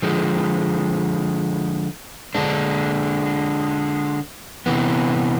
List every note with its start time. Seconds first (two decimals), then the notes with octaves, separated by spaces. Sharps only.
0.02 D3 F3 G#3
2.35 D3 G#3 D4
4.66 C3 E3 B3